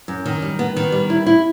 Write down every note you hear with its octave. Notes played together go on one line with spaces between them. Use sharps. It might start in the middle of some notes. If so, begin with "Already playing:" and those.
F#2
D#3
G3
B3
D#3
G3
E4
E4